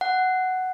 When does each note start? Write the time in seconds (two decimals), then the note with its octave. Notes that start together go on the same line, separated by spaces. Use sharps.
0.01 F#5